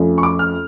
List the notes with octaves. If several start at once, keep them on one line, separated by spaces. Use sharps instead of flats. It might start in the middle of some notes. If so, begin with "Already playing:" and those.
Already playing: F2 F3 A3 C#4
C#6
D6
F6